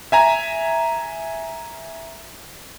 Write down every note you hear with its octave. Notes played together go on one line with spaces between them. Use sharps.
E5 G#5 A#5